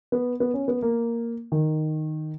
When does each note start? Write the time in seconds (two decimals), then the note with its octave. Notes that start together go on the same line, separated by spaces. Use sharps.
0.12 B3
0.40 B3
0.54 C#4
0.68 B3
0.82 A#3
1.52 D#3